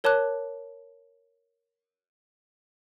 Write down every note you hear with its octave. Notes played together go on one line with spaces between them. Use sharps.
A#4 C#5 A5 D6 F#6